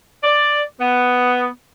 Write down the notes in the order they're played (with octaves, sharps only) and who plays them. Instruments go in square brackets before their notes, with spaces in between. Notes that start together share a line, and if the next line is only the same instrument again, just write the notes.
[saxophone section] D5
B3